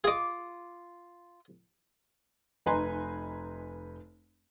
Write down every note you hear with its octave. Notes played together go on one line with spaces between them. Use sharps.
F4 G#4 D#5 D6
F1 D#4 B4 G#5 A#5 C6